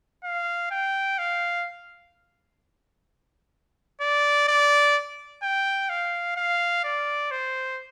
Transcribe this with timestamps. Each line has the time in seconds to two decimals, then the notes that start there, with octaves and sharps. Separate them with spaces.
0.24 F5
0.71 G5
1.18 F5
4.01 D5
4.48 D5
5.43 G5
5.90 F5
6.37 F5
6.84 D5
7.31 C5